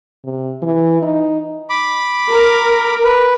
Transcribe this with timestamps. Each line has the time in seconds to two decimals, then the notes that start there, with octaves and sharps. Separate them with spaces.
0.24 C3
0.62 E3
1.02 D#4
1.70 B5 D6
2.31 A#4
3.04 B4